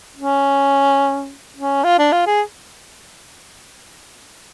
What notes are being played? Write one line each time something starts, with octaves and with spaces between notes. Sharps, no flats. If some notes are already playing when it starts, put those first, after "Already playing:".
C#4
C#4
F4
D4
F4
G#4